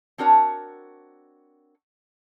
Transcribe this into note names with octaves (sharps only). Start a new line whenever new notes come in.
C4 D4 F#4 A#4 C#5 A5